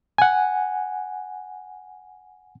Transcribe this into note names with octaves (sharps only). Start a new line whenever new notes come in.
F#5 G#5